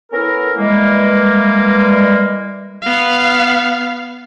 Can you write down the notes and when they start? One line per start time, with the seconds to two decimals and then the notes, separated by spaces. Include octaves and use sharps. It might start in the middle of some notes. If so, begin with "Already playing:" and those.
0.12 B3 C#4 E4 A4 A#4
0.56 E3 G3 G#3 A#3
2.82 B3 F5